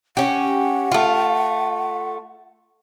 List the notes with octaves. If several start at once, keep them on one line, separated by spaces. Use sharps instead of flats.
C#4 G4 F#5
A3 F4